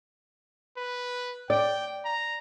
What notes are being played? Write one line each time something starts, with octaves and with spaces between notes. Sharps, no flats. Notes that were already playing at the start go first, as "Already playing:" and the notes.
B4
D5 G5
A#5